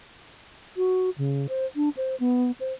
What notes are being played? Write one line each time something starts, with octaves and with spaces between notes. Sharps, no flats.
F#4
C#3
C5
D4
C5
B3
C5